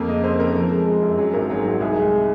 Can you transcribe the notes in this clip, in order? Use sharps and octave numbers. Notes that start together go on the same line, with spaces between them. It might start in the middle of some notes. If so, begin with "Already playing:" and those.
Already playing: F2 A#3
C#3 D#5
F2 C5
F2 A#4
F3
G#3
G#3
F#2
F#3 G#4
G#1 A#4
F#3 G#4
G#2 G#4
C2 G#4
G#3